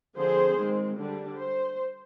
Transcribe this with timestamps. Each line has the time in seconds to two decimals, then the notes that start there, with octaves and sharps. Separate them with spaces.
0.16 D3 F3 C4 G#4 C5
0.57 D#3 G#3 C4
0.97 D3 G3 D4
1.37 C5